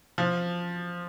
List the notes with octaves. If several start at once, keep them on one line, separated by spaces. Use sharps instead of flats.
F3